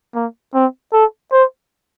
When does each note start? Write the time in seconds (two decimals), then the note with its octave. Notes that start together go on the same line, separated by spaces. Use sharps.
0.15 A#3
0.54 C4
0.93 A4
1.32 C5